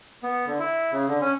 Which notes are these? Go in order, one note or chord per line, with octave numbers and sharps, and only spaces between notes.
B3
D3
E4
C#3
D3
C#4